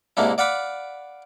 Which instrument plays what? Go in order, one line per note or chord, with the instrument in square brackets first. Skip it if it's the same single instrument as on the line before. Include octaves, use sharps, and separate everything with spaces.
[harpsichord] G#2 C3 A#3 D4 E4
D5 F5 F#5 B5 D6